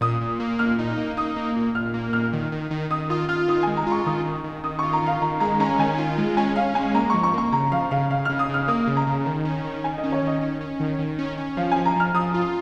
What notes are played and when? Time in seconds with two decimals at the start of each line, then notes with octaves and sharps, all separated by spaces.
0.01 A#2 D#6
0.21 A#2
0.40 A#3
0.59 A#2 F6
0.79 D#4
0.98 A#3
1.17 D#4 D#6
1.36 A#3
1.56 A#2
1.75 A#2 F6
1.94 A#3
2.13 A#2 F6
2.33 D#3
2.52 D#3
2.71 D#3
2.90 D#3 D#6
3.10 F4 D#6
3.29 F4 F6
3.48 D#3 D#6
3.63 G#3 G#5
3.77 A#5
3.87 F4 C#6
4.06 D#3 D#6
4.25 D#3
4.44 D#3
4.64 D#3 D#6
4.79 F4 C#6
4.93 A#5
5.02 D#3 F5
5.22 D#3 A#5
5.40 G#3 A#5
5.60 C#4 A#5
5.79 D#3 G#5
5.98 F4
6.18 G#3
6.37 C#4 G#5
6.56 C#4 F5
6.75 G#3 G#5
6.94 A#3 A#5
7.10 F3 C#6
7.23 C#6
7.34 A#3 C#6
7.52 C#3 A#5
7.72 F3 F5
7.91 C#3 F5
8.10 C#3 F5
8.25 C#3 F6
8.39 D#6
8.49 C#3 F6
8.68 A#3 D#6
8.87 C#3
8.97 A#5
9.07 C#3
9.26 D#3
9.45 C#4
9.64 D#3
9.84 D#3 G#5
9.98 D#5
10.03 C#4
10.12 C#5
10.22 D#3 D#5
10.41 C#4
10.61 C#4
10.80 D#3
10.99 D#3
11.19 C#4
11.38 C#4
11.57 F3 F5
11.72 F3 G#5
11.85 A#5
11.96 F3 F6
12.14 F3 D#6
12.34 F4